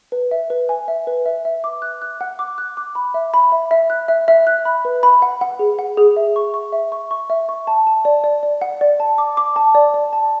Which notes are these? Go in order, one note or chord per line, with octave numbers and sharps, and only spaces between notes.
B4
E5
B4
G#5
E5
B4
E5
E5
D6
F#6
F#6
F#5
D6
F#6
D6
B5
E5
B5
E5
E5
F#6
E5
E5
F#6
B5
B4
B5
F#5
F#5
G#4
F#5
G#4
E5
C#6
C#6
E5
C#6
C#6
E5
C#6
A5
A5
D5
D5
D5
F#5
D5
A5
D6
D6
A5
D5
D5
A5